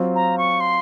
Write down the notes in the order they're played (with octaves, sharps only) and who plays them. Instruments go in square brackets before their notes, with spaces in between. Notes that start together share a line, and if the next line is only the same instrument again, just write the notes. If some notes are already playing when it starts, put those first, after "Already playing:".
Already playing: [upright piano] F#3 C4 F4 C5
[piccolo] A#5
C#6
C6